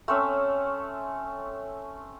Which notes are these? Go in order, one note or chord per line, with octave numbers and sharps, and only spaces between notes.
A3 C4 C#4 E5